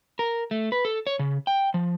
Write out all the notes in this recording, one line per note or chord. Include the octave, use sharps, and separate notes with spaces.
A#4
A3
B4
A4
C#5
C#3
G5
F3